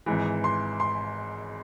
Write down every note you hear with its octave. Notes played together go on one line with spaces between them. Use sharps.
G#1 G#2 E3
C6
C6